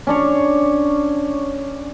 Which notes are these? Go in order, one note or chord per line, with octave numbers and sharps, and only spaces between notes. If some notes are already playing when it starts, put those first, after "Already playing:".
C#4 D4 C#5